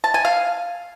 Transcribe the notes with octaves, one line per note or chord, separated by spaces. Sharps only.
A5
G#5
F5